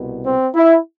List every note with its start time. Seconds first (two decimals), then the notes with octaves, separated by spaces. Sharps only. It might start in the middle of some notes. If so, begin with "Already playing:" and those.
Already playing: C2 B2
0.24 C4
0.55 E4